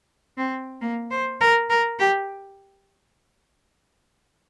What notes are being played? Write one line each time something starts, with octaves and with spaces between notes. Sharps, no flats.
C4
A#3
C5
A#4
A#4
G4